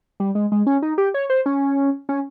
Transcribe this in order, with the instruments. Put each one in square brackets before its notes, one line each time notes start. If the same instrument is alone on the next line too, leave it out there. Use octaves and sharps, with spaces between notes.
[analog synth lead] G3
G#3
G#3
C#4
D#4
G4
C#5
C5
C#4
C#4